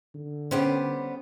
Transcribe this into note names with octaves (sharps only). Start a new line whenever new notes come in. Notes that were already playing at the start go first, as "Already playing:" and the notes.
D3
G3 B3 C#4 G4 C5